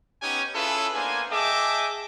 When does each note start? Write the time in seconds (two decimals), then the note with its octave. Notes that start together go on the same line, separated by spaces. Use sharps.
0.22 B3 C#4 D#4 G4 G#5
0.55 C#4 E4 F4 G#4 A4 B4
0.94 A#3 B3 D4 C5 G#5
1.31 G#4 D#5 E5 G5 A5 D6